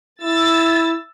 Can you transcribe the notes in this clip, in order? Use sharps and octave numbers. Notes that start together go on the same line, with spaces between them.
E4 E6 A6